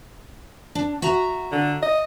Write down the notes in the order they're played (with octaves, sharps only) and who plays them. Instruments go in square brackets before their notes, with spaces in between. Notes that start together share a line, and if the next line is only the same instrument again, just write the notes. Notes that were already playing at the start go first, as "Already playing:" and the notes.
[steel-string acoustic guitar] D4
F#4 E5 A#5
[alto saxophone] D3
D#5